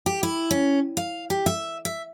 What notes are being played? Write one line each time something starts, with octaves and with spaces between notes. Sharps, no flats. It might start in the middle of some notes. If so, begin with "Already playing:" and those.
G4
E4
C#4
F5
G4
E5
E5